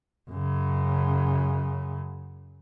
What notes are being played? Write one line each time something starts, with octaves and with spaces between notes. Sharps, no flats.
F#2 C#3